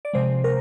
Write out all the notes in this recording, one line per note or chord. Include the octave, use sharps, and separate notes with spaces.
D5
C3 F3 G#3 C5
A#4